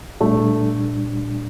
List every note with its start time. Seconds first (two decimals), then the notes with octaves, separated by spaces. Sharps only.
0.20 A#2 G3 A3 D4